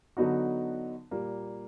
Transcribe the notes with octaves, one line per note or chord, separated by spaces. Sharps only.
D3 F#3 B3 D#4 F#4
A#2 G3 A#3